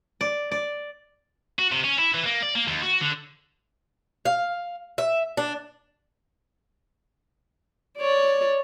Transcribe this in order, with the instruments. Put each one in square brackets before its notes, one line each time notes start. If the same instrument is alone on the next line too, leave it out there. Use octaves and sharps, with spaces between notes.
[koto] D5
D5
[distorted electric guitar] F#4
C3
C#4
E4
E3
A#3
D5
A#3
D#2
F#4
D3
[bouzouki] F5
E5
D4
[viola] C#5 D5